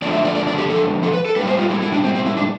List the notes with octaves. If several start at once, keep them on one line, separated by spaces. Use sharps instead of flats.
F2 D3 F3 A3 D5
E5
D5
D5
D5
G4
A4
A4
B4
A4
A2 G3 B4
C5
F4
E4
E4
D4
C4
C4
E4
D4